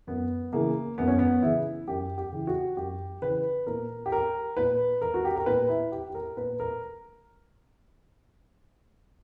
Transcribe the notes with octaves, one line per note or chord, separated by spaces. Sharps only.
F#2 B3
C#3 E3 A#3
F#2 B3
C#4
B3
C#3 E3 E4
F#2 G4
G4
C#3 E3
F#4
F#2 G4
C#3 E3 B4
A#2 A#4
G4
A#4
A#2 B4
A#4
F#4
G4
A#4
A#2 B4
E4
G4
G4
A#4
A#2 B4
A#4